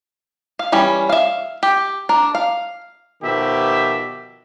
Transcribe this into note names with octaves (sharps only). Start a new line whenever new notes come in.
F5
E3 G3 C#4
E5 F5
G4
D4 A#4
F5
B2 D#3 F3 G4 E5